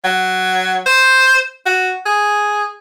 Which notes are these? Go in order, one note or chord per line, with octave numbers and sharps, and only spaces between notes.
F#3
C5
F#4
G#4